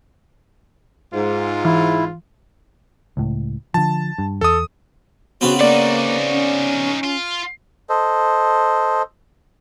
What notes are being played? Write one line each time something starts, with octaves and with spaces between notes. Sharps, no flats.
G#2 F4
E3 E4
C#2 A2
D3 F3 A5
G2
E2 A4 D#6
C#3 B3 C4 F#4
A#3 D#4 F#4 D5
C#4
F4
A4 C5 D#5